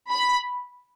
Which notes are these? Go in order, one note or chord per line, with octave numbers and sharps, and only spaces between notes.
B5